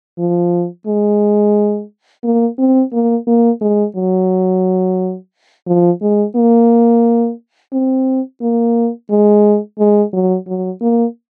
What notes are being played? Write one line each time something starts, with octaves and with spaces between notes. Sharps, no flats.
F3
G#3
A#3
C4
A#3
A#3
G#3
F#3
F3
G#3
A#3
C4
A#3
G#3
G#3
F#3
F#3
A#3